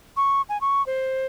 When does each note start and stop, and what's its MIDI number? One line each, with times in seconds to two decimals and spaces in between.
0.17 0.42 85
0.49 0.60 80
0.61 0.85 85
0.86 1.27 72